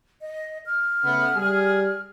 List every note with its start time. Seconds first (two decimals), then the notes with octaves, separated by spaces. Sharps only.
0.21 D#5
0.66 F6
1.04 C#3 A3 B3
1.35 G3 G#4